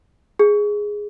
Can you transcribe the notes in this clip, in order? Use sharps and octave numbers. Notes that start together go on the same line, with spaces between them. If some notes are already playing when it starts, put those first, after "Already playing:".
G#4